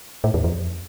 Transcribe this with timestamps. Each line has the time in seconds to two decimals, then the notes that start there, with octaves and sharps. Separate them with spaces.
0.24 A2
0.34 E2
0.44 F2